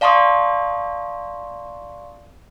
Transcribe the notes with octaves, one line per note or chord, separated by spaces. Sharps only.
D5 F5 A5 C6 C#6 D#6